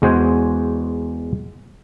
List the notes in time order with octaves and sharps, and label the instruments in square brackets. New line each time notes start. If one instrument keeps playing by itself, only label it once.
[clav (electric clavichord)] E2 G#3 F#4 C5 G#5